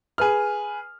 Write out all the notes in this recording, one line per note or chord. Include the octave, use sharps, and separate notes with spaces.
G#4 B4 F6